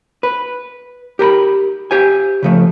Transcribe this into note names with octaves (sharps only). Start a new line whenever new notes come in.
B4
G4 A#4 A#5 B5
G4 C5 G#5
C#3 F3 A3